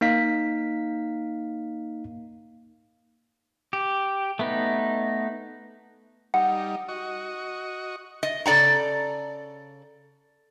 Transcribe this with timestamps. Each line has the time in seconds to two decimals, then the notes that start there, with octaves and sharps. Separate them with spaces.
0.01 A#3 D#4 F5 B6
3.73 G4
4.39 A3 B3 D#4
6.34 G3 D#4 F#5
6.88 F#4 D#5 C#6
8.23 D#5
8.46 C#3 A4 D5 F#5 A#5